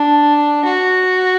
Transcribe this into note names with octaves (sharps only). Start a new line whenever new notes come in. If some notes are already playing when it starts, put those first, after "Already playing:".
Already playing: D4
F#4